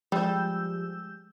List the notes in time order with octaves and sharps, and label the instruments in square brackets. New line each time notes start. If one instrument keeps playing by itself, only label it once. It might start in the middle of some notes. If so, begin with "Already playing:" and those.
[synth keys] F3 G4 [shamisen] G3 [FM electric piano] G#3 E6 G6